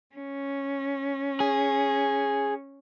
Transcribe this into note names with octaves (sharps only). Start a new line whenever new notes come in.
C#4
G#4